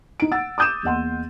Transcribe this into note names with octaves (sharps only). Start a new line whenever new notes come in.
D#4 D7
F#5 E6 A6
D6 D#6 G6 D#7 E7
E2 A#3 D#5 F#5 C6